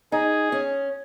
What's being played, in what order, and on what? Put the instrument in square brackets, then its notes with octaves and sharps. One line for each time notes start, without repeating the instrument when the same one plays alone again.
[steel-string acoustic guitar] D#4 [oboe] G#4
[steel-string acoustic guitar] C#4